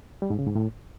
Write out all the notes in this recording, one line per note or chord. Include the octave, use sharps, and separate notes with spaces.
G3
G#2
C#3
G#2
A2